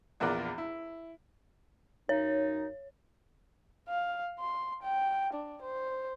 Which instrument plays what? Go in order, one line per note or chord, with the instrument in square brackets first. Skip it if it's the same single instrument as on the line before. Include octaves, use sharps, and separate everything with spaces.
[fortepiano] A#1 E2 F4 A#4 D5 F#6
E4
[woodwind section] F#2 D#4 [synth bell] C#5
[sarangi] F5
C6
G5
D4
C5